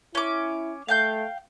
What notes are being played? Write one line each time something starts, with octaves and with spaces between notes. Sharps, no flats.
C#4 E4 D6
A3 F5 G5 G6